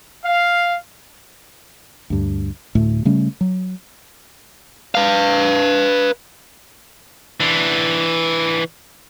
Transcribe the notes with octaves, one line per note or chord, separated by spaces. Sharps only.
F5
D2 G2
D2 A2 A3
C#3 G3 A3 C#4
F#3
B4 F5
E3 D4